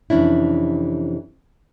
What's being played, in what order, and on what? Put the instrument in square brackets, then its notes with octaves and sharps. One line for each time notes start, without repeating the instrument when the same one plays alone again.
[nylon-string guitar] F2 C3 E3 C#4 D4 E4